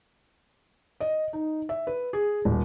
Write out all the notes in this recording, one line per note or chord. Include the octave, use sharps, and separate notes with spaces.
D#5
D#4
E5
B4
G#4
D#1